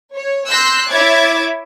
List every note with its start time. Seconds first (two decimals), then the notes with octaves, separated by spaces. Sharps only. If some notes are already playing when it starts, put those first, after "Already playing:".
0.15 C#5
0.50 C6 E6 F#6 G6 A#6 C7
0.89 E4 C#5 E5 D6 G#6 A6